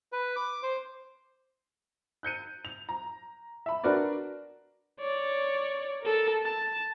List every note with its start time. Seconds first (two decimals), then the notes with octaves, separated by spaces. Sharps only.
0.12 B4
0.36 D6
0.63 C5
2.23 F#6 G6 C#7 D#7
2.65 F7
2.89 A#5
3.66 E5 B5
3.84 D4 F#4 A#4 B4 D5
5.00 C#5 D5
6.01 A4 A#4
6.43 A5